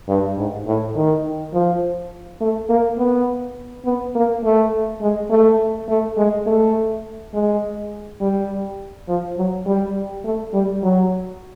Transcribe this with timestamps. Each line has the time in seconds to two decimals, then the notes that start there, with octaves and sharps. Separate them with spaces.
0.09 G2
0.38 G#2
0.66 A2
0.96 D#3
1.53 F3
2.41 A3
2.69 A#3
2.98 B3
3.85 B3
4.15 A#3
4.44 A3
5.02 G#3
5.30 A3
5.89 A3
6.17 G#3
6.47 A3
7.34 G#3
8.21 G3
9.08 F3
9.38 F#3
9.66 G3
10.24 A3
10.54 G3
10.83 F#3